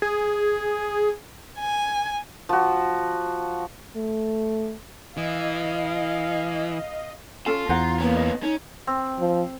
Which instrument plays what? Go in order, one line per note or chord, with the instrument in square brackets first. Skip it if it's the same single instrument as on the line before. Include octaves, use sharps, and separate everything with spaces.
[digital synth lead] G#4
[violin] G#5
[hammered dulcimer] F3 F#4
[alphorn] A3
[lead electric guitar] E3 [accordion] D#5 [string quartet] F5
[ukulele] C#4 A4 A5 [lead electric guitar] F4
[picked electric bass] E2 [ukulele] C5 F#5 A#5
[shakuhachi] A#3 [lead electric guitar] B3 C#4
[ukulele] D#5
[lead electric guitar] C#4 [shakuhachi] D#4
[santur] C4
[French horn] F3